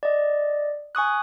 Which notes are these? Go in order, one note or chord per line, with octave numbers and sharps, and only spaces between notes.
D5 D#5
G#5 C#6 D#6 F#6